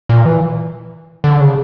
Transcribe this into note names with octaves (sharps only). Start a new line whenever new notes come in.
A#2
E3
D3
C#3